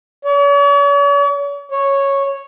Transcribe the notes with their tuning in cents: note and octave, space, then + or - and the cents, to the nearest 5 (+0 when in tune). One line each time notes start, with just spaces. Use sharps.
C#5 +45
C#5 -5